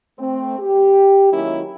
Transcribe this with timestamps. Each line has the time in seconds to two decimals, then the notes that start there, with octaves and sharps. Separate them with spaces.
0.19 A3 C4
0.59 G4
1.32 D#3 F#3 G#3 A#3 C#4 E4